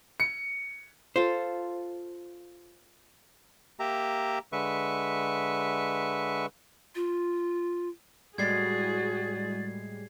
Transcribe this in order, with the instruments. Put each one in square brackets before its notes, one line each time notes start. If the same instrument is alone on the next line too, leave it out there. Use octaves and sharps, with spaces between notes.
[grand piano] C#7
[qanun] F4 A4 [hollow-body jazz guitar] C5
[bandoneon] A#3 G4 E5 A#5
D3 G#3 B4 E5 C#6
[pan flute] F4
[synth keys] A2 G3 G#3 [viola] F#4 G#4 [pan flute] D5 [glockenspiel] G#6 C7